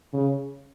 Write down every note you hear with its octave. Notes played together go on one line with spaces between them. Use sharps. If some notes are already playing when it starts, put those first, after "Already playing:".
C#3